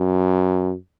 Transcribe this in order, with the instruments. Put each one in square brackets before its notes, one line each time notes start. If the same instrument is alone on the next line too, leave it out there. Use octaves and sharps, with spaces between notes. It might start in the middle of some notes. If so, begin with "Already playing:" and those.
Already playing: [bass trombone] F#2